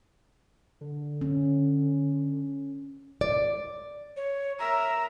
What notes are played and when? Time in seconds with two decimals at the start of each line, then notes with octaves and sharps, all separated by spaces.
0.81 D3
1.21 C#4
3.21 D5
4.16 C#5
4.59 A#4 E5 A#5